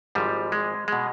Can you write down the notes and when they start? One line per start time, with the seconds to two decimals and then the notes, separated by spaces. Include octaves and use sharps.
0.15 G#1 G#2 F3 G3
0.52 G#3
0.88 B2 G#3